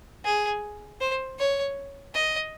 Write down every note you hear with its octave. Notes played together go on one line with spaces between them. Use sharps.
G#4
C5
C#5
D#5